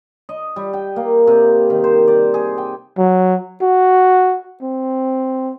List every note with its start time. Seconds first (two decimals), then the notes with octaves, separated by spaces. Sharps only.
0.29 D#5
0.56 G3
0.73 G5
0.96 A#3
1.27 C3
1.70 D#3
1.84 C5
2.07 D5
2.34 G#4
2.58 G5
2.98 F#3
3.62 F#4
4.62 C4